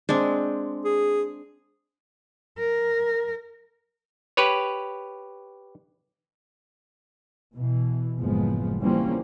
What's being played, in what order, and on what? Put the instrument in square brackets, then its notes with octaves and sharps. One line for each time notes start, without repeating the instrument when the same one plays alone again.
[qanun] G#3 C4 [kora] D4
[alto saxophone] G#4
[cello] A#4
[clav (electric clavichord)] G4 B4 C#5
[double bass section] B2 E3
F#1 A2 F3 G#3 B3
E3 F3 G3 A#3 C4 C#4